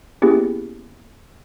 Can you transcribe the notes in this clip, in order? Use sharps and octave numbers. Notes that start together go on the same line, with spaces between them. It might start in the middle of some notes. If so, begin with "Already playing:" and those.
A#3 B3 C#4 E4 G4 G#4